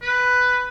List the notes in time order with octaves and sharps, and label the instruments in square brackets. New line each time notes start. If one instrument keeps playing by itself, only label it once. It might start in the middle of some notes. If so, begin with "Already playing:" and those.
[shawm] B4